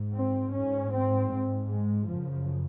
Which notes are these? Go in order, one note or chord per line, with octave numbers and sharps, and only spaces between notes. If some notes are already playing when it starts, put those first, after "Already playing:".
Already playing: G#2
C4
G#2 C#4
C4
G#2
G#3
F#2 C#3 F3